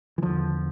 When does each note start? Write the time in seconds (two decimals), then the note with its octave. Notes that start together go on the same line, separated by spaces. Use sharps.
0.18 E3
0.22 E2 D3 F3